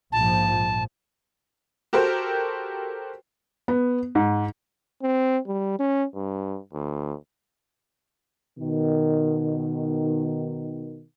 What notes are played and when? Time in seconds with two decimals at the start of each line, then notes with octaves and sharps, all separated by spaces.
0.12 A#1 G#2 F3 A5
1.93 F#4 G4 A4 A#4 C5
3.68 B3
4.15 G#2
5.02 C4
5.47 G3
5.79 C#4
6.15 G2
6.73 D2
8.58 B2 D#3